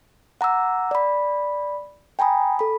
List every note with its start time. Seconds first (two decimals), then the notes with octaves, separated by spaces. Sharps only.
0.41 F#5 A#5 D6 E6
0.91 D5 B5
2.19 G5 G#5 A#5 B5 D#6
2.59 A4 B5